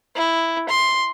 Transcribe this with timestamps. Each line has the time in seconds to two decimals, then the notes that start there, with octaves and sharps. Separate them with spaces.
0.15 E4
0.69 C6